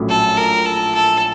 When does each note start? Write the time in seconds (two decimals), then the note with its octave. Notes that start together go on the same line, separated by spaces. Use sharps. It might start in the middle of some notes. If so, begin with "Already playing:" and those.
Already playing: A#1 A2 F#3 A3 C#4
0.09 A4
0.37 A#4
0.66 A4
0.94 A4